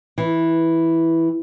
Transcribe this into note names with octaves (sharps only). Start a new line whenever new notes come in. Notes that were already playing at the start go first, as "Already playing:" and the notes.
E3